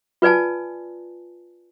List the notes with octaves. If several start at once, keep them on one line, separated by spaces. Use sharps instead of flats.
F4 B4 D5 G#5 A5